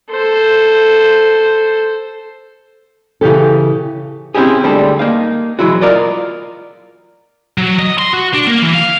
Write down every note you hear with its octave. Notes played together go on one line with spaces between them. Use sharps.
A4 C5
C#3 E3 G4 A4
C4 C#4 E4 G4 G#4
D2 G3 G#3 D4 A4
A#3 D#4 F5
E3 F#3 G#3 E4 F#4
F4 A#4 D5 D#5
F#3
D#5
C6
F#4
D4
A#3
E3
F5